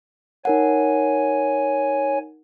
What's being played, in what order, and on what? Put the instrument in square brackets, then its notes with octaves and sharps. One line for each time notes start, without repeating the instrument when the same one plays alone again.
[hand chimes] D#4 A#4 F#5 [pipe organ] C#5 G#5